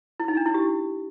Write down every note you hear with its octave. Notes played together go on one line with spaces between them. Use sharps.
E4
D#4
D4
E4
G4